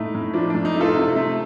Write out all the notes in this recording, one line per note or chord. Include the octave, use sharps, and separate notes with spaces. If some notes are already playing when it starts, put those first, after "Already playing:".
Already playing: A2 A3 D#4
A2
F3 D4
A2 D4
D#4
A3
F4 A4
C3
A3